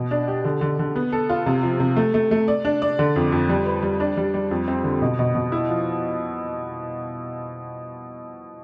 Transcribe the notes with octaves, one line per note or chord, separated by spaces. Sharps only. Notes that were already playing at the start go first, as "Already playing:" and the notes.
Already playing: B2
D4
G4
D3
D3
D3
B3
A4
F4
C3
F3
C3
A3
A3
A3
D5
D4
D5
D3
F2
F2
G3
B4
G3
D4
G3
G3
F2
C4
D3
B2
B2
B2
E4
F3